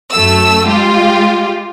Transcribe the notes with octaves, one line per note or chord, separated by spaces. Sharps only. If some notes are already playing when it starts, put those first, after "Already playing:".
F#2 A3 E6
G#3 F4 G4